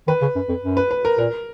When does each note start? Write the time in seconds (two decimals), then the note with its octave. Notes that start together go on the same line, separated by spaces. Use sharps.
0.07 D#3 B4
0.21 C#3
0.36 F#2
0.49 F2
0.63 F#2
0.77 B4
0.91 B4
1.05 A#4
1.18 A#2 A#4